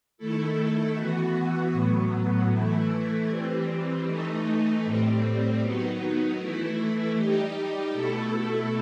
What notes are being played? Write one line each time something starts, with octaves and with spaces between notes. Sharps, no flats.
D#3 A3 E4 A4
E3 B3 F#4
A2 F#3 B3
E3 A3 E4
E3 G3 C4
E3 A3 D#4
A2 G3 C4
D#3 F#3 B3 D#4
E3 A3 E4
G3 D#4 G4
B2 A3 E4 A4